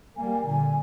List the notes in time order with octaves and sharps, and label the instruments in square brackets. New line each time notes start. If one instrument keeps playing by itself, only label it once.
[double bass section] G3 A#3 [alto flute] G#5
[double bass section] A#2 D3 [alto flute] G#5